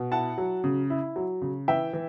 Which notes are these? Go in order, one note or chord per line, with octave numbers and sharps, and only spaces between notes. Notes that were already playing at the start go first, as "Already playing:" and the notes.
Already playing: B2
E4 F#5 A5
F#3
C#3
E4
F#3
C#3
E3 E5 G5
E3